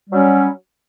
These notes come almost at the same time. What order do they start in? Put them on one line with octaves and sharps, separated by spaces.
G3 F#3 C#4